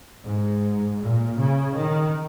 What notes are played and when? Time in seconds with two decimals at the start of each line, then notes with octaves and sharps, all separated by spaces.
0.25 G#2
1.00 A#2
1.37 C#3
1.75 D#3